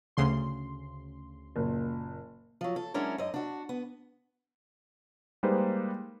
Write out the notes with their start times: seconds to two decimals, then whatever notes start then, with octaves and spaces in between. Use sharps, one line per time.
0.17 D2 C#3 C6
1.56 F#1 A#2
2.61 F3 F#3
2.76 A4
2.94 F#3 G#3 C#4 D4 E4 A#4
3.18 F#2 D#5
3.34 D4 F#4
3.69 B3
5.43 G3 G#3 A#3 D#4 B4 C5